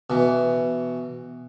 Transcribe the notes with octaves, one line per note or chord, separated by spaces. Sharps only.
B2 E3